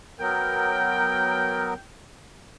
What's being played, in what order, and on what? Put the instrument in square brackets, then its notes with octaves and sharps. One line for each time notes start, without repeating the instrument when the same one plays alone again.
[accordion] F#3 B3 A#4 [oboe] G5